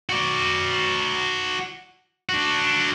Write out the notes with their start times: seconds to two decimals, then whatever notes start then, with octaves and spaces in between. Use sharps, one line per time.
0.09 F#4 D5
2.29 D4 F#4